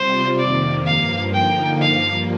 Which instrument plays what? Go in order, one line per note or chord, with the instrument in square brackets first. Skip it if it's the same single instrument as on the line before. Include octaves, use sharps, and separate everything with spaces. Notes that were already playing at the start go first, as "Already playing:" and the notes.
Already playing: [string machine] C3 G3 C4 F4 [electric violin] C5
[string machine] F2 C3 D#3 A#3 [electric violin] D5
[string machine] G2 F3 A#3 [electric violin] F5
[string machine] D3 F3 A#3 D#4 [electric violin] G5
[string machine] G2 F3 A#3 [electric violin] F5